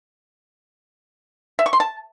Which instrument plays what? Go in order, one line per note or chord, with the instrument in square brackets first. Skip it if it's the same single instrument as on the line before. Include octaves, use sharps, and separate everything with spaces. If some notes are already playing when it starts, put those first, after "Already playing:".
[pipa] E5
C#6
C6
A5